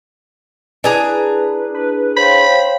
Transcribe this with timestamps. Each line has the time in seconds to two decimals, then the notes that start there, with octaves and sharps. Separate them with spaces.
0.84 D4 E4 G#4 B4 A#5
1.74 B4
2.16 C5 C#5 F5 G5 B5